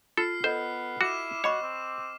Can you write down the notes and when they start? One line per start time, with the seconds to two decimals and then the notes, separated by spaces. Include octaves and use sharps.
0.17 F4 A4 F6 C7
0.44 B3 A4 C5 D#5
1.01 E4 F#4 D6 E7
1.44 F#4 C#5 D#5 B5 C#6
1.62 C4